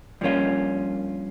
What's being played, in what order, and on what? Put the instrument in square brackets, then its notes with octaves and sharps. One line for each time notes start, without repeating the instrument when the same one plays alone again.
[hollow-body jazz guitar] G2 F3 A#3 C#4 F4